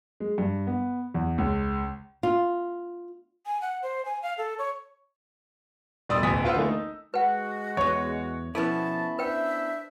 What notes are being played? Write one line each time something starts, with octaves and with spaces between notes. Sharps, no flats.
G#3
G2
B3
E2
C#2
F4
G#5
F#5
C5
G#5
F5
A4
C#5
E1 G3 D5 C6 D#6 E6
E1 A1 D2 G#5 D#6 B6
F4 B4 C5 F5 F#5 E6
D3 E3 A3 A#3
D#4
G#3 F#4 B4 F#5
E2 B3 C#5
B2 F3 B3 C#4 E4 A4 B4 A5
D4 B4 C5 E5 G5